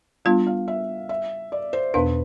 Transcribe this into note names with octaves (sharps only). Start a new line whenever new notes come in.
G3 B3 D4 F4 F5
F5
E5
E5
D5
C5
E2 B2 B3 D4 B4